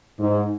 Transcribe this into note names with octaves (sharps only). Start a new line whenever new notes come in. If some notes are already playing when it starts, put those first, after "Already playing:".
G#2